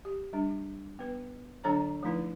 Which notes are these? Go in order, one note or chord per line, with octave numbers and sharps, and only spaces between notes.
G4
G3 D4
B3 B4
D3 F#3 D4 A4 C#5 A#5
F3 A3 D#4 E4 B4